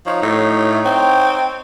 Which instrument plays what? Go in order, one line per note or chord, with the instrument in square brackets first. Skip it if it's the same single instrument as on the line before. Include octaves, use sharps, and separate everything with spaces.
[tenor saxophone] F3 [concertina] D#4 C#5
[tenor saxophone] A2
C4